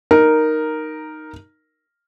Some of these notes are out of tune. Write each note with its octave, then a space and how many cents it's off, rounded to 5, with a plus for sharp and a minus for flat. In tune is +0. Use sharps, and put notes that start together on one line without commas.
D#4 -5 A#4 +0